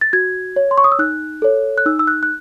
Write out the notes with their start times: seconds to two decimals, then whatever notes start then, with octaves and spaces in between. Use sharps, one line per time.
0.01 A6
0.13 F#4 G#6
0.56 C#5
0.71 C6
0.78 C#6
0.84 D#6
0.92 E6
0.99 D#4 F#6
1.42 A4 C#5
1.78 F#6
1.86 D#4 E6
1.99 E6
2.07 F#6
2.23 F#6